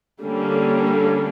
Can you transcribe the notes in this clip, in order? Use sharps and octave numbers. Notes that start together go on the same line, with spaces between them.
D3 G3 A#3 C#4